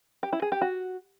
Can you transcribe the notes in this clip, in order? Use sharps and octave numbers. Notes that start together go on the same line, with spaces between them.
G4
E4
G#4
G4
F#4